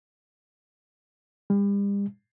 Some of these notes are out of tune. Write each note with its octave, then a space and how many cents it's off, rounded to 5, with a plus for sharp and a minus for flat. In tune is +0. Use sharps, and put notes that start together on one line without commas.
G3 +40